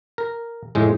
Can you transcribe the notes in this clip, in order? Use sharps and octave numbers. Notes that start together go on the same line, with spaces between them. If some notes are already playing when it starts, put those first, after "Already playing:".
A#4
F2 A2 G#3